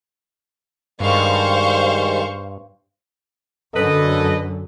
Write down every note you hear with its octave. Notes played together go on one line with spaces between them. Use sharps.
G2 D#3 G3 G#3 C5 F5 C#6
F#2 D3 A4 B4 D#5